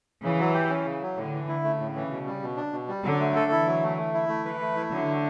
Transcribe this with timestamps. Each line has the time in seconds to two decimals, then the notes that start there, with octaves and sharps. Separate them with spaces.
0.23 C#3 E3
0.39 F#3
0.54 G4
0.69 C#4
0.85 C#3
1.02 F#3
1.17 A2 D3
1.33 E3
1.48 E4
1.63 C#3 A3
1.80 A2
1.95 E3
2.11 B2
2.26 G3
2.42 B2
2.57 D4
2.72 B2
2.89 G3
3.04 D3 F#3
3.20 A3
3.36 A4
3.50 E3 E4
3.67 F#3
3.82 A3
3.97 A3
4.14 E4
4.29 A3
4.44 E3 B4
4.61 A3
4.76 E4
4.91 D3 F#3
5.08 A3